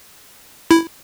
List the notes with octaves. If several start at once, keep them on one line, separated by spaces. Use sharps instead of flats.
E4